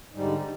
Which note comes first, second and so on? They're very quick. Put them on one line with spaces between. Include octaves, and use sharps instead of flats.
G#2 G3 D3